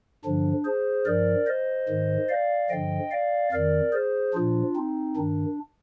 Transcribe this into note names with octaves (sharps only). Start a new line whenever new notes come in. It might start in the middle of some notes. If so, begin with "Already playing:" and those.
G2 D3 F3 D4
G#4 C5
G2 F3 A#4 D5
C5 D#5
G#2 D#3
D5 F5
G2 D3 F3 D#5 G5
D5 F5
F2 D#3 A#4 D5
G#4 C5
A#2 F3 D4 F4
C4 D#4
G2 D#3 D4